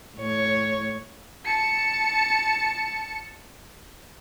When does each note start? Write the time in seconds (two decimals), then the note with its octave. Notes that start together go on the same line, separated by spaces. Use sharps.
0.16 A2 C#5
1.46 A5 C#7